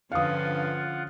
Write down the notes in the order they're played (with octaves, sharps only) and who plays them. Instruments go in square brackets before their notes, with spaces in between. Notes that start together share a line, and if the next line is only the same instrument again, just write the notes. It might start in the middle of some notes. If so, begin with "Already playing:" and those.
[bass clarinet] G2 [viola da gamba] D3 F3 C#4 [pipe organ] F4 F#5 [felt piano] F5 D#6